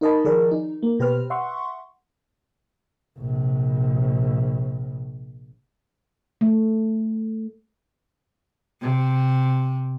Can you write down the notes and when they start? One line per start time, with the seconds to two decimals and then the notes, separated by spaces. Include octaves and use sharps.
0.01 D#4 A#4 D#5 A5 B5
0.24 D#3 F3 G#4 A#4 D5
0.51 D#4
0.83 A#3
0.99 B2 G4 B4 C5 F6
1.30 E5 F#5 C6 C#6
3.18 A#1 C3
6.41 A3
8.81 C3